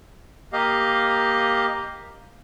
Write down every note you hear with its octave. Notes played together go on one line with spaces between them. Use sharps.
A#3 G4 D#5 F5